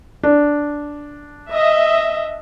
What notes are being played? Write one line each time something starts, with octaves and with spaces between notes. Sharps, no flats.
D4
D#5 E5